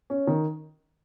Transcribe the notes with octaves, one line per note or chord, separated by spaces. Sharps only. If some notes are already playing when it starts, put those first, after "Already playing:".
C#4
D#3